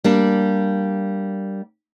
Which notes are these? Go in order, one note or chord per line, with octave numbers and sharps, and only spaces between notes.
G3 A#3 D4